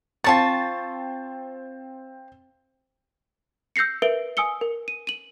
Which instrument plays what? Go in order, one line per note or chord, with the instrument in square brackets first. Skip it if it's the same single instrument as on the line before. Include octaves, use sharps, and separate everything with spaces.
[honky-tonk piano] C4 A6 [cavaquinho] F4 A5 C#6
[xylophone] E6 G6 A#6 C7 C#7
A#4 B4 E5 D7 G7
G#5 D#6 E6 C#7 G7
A#4
D#7
D#7 F#7